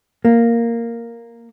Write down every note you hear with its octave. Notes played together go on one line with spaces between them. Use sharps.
A#3